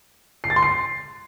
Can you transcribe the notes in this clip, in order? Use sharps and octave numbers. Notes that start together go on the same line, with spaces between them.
C7
A6
C6
C7